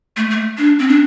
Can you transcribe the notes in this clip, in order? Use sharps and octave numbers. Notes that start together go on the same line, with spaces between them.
A3
A3
D4
C4
D4